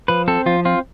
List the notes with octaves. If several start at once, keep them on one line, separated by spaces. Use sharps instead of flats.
F3 B4
C4 A4
F3 F4
C4 F4